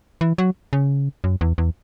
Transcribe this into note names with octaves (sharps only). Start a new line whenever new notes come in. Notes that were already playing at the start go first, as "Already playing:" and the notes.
E3
F#3
C#3
F#2
E2
E2